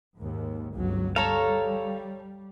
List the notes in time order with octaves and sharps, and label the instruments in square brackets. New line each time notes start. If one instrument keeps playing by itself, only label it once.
[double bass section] D#2 G#2
G1 C#2 F#3
[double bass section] G3 [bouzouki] A4 C#5 [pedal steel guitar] F5 A#5